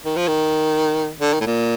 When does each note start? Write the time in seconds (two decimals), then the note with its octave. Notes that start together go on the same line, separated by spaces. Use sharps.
0.05 D#3
0.17 F3
0.28 D#3
1.20 D3
1.33 D#3
1.41 A2
1.46 A#2